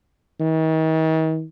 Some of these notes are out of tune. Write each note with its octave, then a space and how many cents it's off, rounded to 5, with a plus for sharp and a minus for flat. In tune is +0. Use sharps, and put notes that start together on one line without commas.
D#3 +40